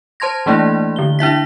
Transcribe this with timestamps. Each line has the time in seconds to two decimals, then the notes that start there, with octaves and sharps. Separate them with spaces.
0.20 C5 A5 C6 G#6 A#6
0.46 E3 A3 A#3 D4 E4
0.96 D3 G7
1.19 D4 E4 E5 B6